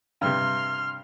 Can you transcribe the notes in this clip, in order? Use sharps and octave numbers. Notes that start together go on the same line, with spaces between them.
G2 C3 C6 F6